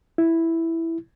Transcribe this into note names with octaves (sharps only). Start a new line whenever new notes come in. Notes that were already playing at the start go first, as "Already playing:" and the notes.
E4